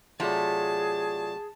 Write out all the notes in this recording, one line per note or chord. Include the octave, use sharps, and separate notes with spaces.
C3 F#3 A3 F4 G#4 D5 A5